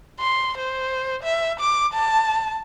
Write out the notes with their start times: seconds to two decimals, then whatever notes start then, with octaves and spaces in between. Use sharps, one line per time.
0.20 C6
0.58 C5
1.24 E5
1.60 D6
1.94 A5